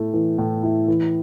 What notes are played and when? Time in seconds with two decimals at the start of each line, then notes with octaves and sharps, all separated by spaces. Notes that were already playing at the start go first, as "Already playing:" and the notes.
Already playing: A2 A3 E4
0.13 E3
0.38 A2
0.63 E4
0.88 E3